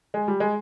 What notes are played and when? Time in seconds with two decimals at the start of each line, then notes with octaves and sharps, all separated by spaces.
0.14 G#3
0.28 G3
0.40 G#3